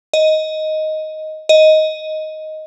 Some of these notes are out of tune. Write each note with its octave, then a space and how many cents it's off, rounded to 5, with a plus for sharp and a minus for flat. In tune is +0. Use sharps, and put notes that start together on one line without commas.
D#5 +5
D#5 +5